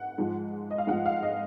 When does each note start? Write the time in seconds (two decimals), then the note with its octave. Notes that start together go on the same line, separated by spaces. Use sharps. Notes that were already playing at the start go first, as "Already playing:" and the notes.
Already playing: F#5
0.18 G#2 F3 G#3
0.71 D#5
0.78 F5
0.87 G#2 F3 G#3 F#5
1.06 F5
1.23 D#5